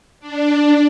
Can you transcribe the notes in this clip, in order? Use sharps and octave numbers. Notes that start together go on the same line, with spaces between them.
D4